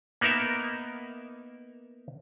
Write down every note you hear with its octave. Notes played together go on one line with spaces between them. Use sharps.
A#3 B3 D#4 A#4 E5